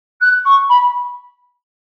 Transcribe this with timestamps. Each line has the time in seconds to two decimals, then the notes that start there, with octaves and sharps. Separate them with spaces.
0.21 F#6
0.45 C#6
0.70 B5